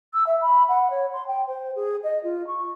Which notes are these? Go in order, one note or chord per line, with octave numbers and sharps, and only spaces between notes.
E6
E5
B5
F#5
C#5
C6
G5
C5
G#4
D#5
F4
C#6